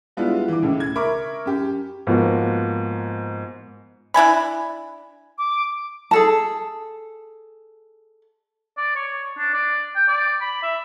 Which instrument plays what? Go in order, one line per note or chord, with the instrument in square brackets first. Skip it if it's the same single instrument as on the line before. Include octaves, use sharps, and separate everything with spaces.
[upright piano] G3 G#3 B3 D4 E4 F4
E3 D6
C#2 A2 C#3
G#6
A#4 E5 B5 C#6 D6
F#2 G4
[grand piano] G#2 F3 A#3 B3 F#4
[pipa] D4 E4 G#5 B5
[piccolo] D6
[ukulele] G#4 A4 A5
[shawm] D5
C#5
D4
D5
G5
D5
B5
E5